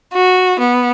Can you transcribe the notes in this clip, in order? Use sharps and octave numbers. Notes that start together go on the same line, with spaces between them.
F#4
B3